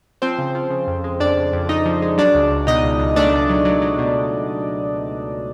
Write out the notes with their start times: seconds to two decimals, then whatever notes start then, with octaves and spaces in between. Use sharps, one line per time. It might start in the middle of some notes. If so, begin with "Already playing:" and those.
0.22 F3 C4 C5
0.38 C#3
0.55 F3
0.70 C#3
0.87 F2
1.04 G#3
1.20 F2 D4 D5
1.37 F2
1.53 F2
1.69 F2 D#4 D#5
1.86 F3
2.02 G#3
2.18 F#3 D4 D5
2.34 C#2
2.50 C#2
2.67 B2 D#4 D#5
2.83 C#2
3.00 C#2
3.16 A3 D4 D5
3.33 C#2
3.49 F#3
3.65 F#3
3.82 F#3
3.98 B2